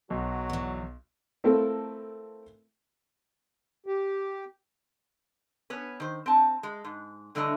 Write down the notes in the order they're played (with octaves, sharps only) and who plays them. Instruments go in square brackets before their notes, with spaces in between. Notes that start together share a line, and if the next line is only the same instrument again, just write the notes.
[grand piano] B1 [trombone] F#3 [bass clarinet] F#4
[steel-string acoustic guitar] E2 E3
[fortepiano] A3 C4 E4 F4 A4 A#4
[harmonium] G4
[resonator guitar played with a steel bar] B3 C#4 B4
D#3 C5
C4 A5
G#3
G#2
G2 D3 E3 A3 D#5 A#5